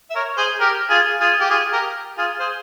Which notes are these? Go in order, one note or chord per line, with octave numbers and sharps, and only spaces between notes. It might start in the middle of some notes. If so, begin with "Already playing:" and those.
E5
A#4 C#5
G#4 C5
G4 A#4
F4 G#4
F4 G#4
G4
F4 G#4
G4 A#4
F4 G#4
G#4 C5